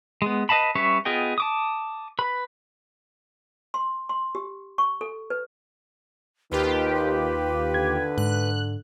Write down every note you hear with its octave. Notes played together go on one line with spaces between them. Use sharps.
G#3 B3
B4 D#5 F5 A5 B5
G3 C#4 B4 C#5 E5
B3 F4 G#4 D#5 G5
A5 D6 D#6
B4 B5
C6
C6
G4
C#6
A4
B4
D#2 D#3 F4 G4 B4
D3 G#6
G#2 F#6